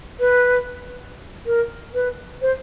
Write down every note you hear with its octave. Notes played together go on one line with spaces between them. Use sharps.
B4
A#4
B4
C5